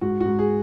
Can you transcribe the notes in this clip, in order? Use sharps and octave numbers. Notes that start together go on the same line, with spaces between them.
G#2 F#4
G#2 F#4
G#4